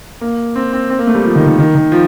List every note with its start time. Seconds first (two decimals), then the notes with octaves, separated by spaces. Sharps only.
0.21 A#3
0.56 C4
0.73 C4
0.90 C4
0.99 A#3
1.07 A3
1.15 G3
1.25 F3
1.35 D#3
1.46 D#3
1.58 D#3
1.75 D#3
1.92 F3